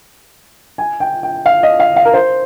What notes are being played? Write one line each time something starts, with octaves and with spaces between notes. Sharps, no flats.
G#5
G5
G5
F5
D#5
F5
F5
A#4
C5